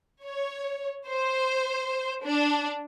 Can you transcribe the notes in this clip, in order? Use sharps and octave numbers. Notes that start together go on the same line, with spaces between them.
C#5
C5
D4